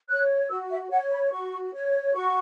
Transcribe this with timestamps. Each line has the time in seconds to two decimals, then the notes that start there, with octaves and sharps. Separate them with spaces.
0.09 C#5 F#6
0.49 F#4 E6
0.70 E5
0.91 C#5 F#5
1.11 B5
1.31 F#4 C#6
1.74 C#5
2.14 F#4 C#6